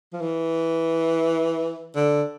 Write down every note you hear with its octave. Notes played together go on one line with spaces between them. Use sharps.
F3
E3
D3